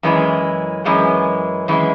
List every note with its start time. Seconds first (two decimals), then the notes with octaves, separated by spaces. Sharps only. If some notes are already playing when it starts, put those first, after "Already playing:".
0.03 F#2 E3 G#3
0.85 F#2 E3 G#3
1.68 F#2 E3 G#3